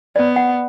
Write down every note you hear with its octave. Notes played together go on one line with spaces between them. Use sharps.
B3 D5
F#5